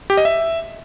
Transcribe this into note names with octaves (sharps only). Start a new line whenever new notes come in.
G4
D#5
E5